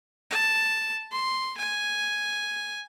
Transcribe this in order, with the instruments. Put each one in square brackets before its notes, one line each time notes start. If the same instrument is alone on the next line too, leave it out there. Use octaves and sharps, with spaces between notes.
[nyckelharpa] A5
C6
G#5